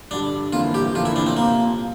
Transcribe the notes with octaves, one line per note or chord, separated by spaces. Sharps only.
G2 D3 G3 D4
G1 F2 E3 A#3 F4
G4
G1 F2 E3 A#3 F4
E4
D4
C4
C2 C3 F3 A#3 C4